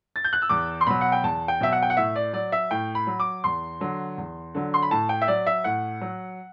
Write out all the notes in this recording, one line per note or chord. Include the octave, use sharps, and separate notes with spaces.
A6
G6
F#6
E6
E2 D6
C6
B2 F#3 B5
F#5
G5
E2 A5
G5
B2 F#3 E5
F#5
G5
F#5
A2 E5
D5
F#3 D5
E5
A2 G5
B5
F#3
D6
E2 C6
D3 F#3
E2
D3 F#3
C6
B5
A2 A5
G5
E5
F#3 D5
E5
A2 F#5
F#3